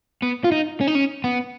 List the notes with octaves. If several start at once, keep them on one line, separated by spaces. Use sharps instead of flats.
B3
F4
D#4
C#4
D#4
C#4
B3